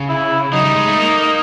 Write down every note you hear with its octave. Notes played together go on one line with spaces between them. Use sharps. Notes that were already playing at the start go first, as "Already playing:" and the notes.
Already playing: C#3
E4
F#3 D#4
G3
G#3
A3
A#3